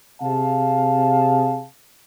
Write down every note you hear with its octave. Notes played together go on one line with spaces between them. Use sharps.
C3 G#4 F5 A5